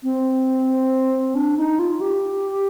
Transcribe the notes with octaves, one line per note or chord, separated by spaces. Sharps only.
C4
D4
D#4
F4
G4